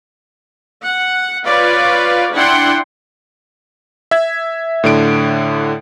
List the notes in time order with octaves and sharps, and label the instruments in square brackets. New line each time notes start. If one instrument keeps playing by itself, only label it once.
[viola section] F#5
F4 B4 C#5 D5 F5
D4 E4 F#5 G5 C6
[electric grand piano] E5 G#6
A2 D3 D7